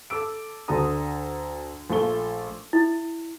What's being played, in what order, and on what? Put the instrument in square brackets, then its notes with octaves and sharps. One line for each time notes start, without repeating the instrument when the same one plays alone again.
[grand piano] A4 D6 E6 D7
D2 D3 F#4 A4 A#5 D#6
A#1 A3 F4 A4 C#6 G7
[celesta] E4